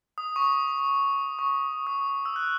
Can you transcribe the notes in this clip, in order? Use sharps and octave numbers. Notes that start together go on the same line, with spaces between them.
D#6
C#6
D#6
C#6
D#6
E6
F#6